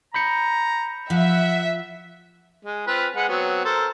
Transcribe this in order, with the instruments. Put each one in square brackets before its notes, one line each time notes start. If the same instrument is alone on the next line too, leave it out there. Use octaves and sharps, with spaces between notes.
[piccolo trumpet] A#5 [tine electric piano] B5 G6 C#7
[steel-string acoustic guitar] F3 [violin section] E5 [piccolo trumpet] F#5
[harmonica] G#3
C4 F4 B4
G#3 B4 F#5
F#3 B3 C4
A4 A#4 C5